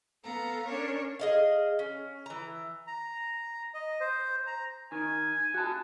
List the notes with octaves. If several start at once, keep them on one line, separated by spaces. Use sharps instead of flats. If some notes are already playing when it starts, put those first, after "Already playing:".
B3 A4 F5 A#5
C#4 D4 A#4 C#5
G#4 D#5 F5
C#4
E3 A#5
A#5
D#5
C5
A#5
D#3 G#5
F#4 A5